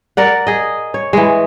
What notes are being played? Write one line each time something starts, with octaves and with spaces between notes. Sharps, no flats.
A#4 D5 F#5
G#4 D#5
C#5
E3 G#3